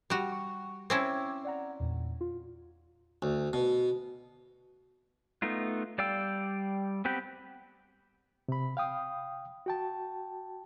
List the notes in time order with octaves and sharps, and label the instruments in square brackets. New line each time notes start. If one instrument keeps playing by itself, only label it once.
[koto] G3 F#4
[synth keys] C#6
[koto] C4 C#4 E4 [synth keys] D6 E6
[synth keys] D5 F#5 A#5
E2 A#2
F4
[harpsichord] D2
B2
[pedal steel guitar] A3 B3 D#4 F4
G3 D5 F5 G5 E6
B3 C4 G4 B4
[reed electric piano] C3 B5
F5 G5 D#6
F#4 G5 A5